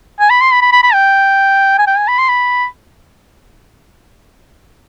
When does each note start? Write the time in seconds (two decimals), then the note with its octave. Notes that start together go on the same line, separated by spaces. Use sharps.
0.20 G#5
0.30 B5
0.41 C6
0.51 B5
0.62 B5
0.72 B5
0.83 B5
0.93 G5
1.78 G#5
1.87 G5
1.98 G#5
2.08 B5
2.18 C6
2.28 B5